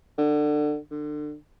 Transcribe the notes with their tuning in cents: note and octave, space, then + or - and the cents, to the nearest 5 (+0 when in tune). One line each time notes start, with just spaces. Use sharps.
D3 +25
D3 +30